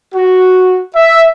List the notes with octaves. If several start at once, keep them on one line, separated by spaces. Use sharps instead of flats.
F#4
E5